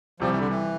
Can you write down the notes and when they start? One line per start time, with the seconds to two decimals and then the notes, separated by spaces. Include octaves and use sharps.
0.20 C2 C3 F3 G3
0.30 E3
0.38 D3
0.48 E3